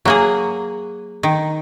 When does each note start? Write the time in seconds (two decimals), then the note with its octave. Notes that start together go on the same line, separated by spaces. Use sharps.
0.05 F#3 A#3 G#4
1.23 D#3